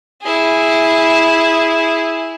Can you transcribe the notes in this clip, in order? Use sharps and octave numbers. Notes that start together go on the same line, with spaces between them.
E4 G#4